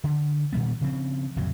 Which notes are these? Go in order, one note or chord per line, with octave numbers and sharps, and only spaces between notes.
D3
A#2 D#3 G3 B3
C#3 F3 C4
D1 F2 C#3 F#3